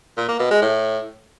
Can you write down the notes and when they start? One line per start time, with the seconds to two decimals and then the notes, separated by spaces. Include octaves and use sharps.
0.17 A#2
0.28 A#3
0.39 B2
0.51 G#3
0.62 A2